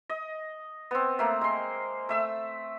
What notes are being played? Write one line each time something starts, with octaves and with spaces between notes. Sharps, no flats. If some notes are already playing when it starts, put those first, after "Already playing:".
D#5
B3 C4
A3 A#3
G#3 C6
A3 E5 E6